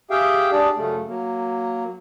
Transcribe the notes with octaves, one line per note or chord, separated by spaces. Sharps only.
G4 G#4 E5 F5 G5
D4 G4 G#4 D5
F#2 C#3 A3
F#3 A#3